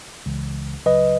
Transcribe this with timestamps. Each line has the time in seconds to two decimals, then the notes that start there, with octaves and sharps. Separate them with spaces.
0.26 C#2 C#3 E3 G#3
0.86 C#2 C#3 F#3 B4 D#5